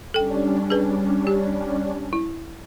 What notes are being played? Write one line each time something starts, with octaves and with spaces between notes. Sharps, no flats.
G3 C#4 D4 A4 G5
G#4 B4
G4
E4